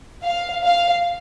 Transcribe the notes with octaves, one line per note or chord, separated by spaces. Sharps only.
F5
F5